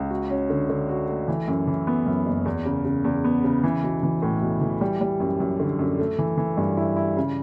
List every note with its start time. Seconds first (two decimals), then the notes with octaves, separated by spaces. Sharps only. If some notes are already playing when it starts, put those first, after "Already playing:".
Already playing: C#2
0.10 F#4
0.30 C#4
0.50 D3
0.69 D3
0.89 F#4
1.09 A3
1.28 E3
1.48 F#2
1.67 E3
1.87 B3
2.06 F#2
2.26 F#1
2.45 E2
2.65 C#3
2.85 C#3
3.05 E2
3.24 B3
3.44 C#3
3.64 E3
3.83 B1
4.03 E3
4.22 A2
4.42 B1
4.61 E3
4.81 G3
5.01 G3
5.20 F#2
5.40 F#2
5.60 D3
5.79 F#2
5.99 A3
6.19 E3
6.38 E3
6.57 G2
6.77 E4
6.96 E4
7.17 C#3